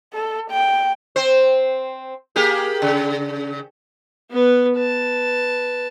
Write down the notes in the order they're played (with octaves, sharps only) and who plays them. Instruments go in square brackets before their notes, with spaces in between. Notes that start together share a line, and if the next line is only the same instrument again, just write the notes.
[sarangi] A4
G5
[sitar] C4 C5
A#3 G4 G#4
C#3
[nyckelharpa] B3 B4
B4 A5